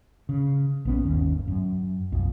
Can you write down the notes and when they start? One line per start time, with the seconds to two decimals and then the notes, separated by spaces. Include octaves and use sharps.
0.29 C#3
0.85 A#1 B3 C#4
1.03 G1 D#2 C#4
1.48 F#2
2.12 B1 F2